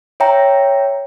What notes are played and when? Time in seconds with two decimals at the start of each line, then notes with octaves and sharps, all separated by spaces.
0.20 C#5 E5 G5 A#5